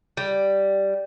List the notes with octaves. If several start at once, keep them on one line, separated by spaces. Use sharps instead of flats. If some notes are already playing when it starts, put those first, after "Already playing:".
G3